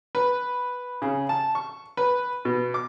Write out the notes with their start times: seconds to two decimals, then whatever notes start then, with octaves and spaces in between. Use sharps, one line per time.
0.15 B4
1.02 C#3
1.29 A5
1.55 C#6
1.97 B4
2.45 B2
2.74 D6